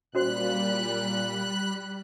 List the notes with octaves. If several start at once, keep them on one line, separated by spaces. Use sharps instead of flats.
A#2 G3 C#4 F#4 C5 B5 F#6